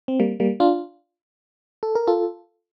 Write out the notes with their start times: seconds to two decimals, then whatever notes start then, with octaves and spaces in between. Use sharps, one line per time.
0.08 C4
0.20 G3 A#3
0.40 G3 A#3
0.60 D4 F4
1.83 A4
1.95 A#4
2.07 F4 A4